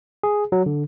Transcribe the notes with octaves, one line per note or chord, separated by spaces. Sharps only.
G#4
F#3
D3